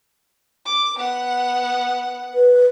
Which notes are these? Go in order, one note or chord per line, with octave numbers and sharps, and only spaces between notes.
D6
B3 F#5
B4